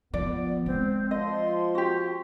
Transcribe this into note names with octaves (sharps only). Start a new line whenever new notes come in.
F3 B3 D5
G#3 C4
F3 D#5 C6
F#4 G4